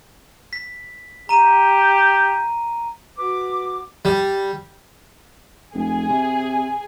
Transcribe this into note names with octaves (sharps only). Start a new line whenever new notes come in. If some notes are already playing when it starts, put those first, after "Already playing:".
B6
G4 A#5 D#7
F#4 B4 D6
G3
F1 G#4 G#5
C3